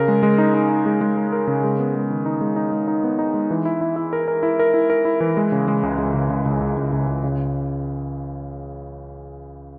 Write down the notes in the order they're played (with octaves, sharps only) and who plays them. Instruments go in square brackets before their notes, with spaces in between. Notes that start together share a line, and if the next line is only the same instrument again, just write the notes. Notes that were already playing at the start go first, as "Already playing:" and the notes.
Already playing: [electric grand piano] C#3 A#4
G#3
G#3
D#4
D#4
D#4
G#3
G#3
A#4
A#4
C#3
G#3
B3
G#3
D#3
D#4
G#3
D#4
G#3
D#4
B3
D#4
G#3
E3
E4
E4
E4
A#4
A#4
E4
A#4
E4
A#4
E4
E3
G#3
C#3
G#3
C#2
G#3
C#3
C#2
C#2
C#2
C#2
C#2
C#2
C#3